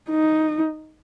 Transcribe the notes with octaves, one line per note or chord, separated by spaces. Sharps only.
D#4